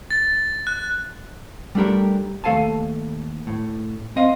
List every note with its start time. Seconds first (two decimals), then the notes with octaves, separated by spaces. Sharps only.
0.11 A6
0.67 F#6
1.75 G3 A3 D4 G4 A#4
2.44 D#2 A3 A4 F5 G#5 A5
3.47 A2
4.16 C4 D#5 F5